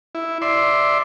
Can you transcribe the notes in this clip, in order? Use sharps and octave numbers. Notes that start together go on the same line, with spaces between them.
E4
D5 E5 C6